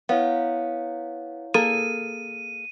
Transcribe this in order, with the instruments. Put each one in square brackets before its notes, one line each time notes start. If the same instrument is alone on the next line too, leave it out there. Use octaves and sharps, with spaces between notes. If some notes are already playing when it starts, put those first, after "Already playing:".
[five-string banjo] B3 [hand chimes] E4 C#5 F5
[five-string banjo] A#3 G#4 A4 [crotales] D#7